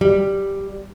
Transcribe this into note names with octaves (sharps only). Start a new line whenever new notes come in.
G3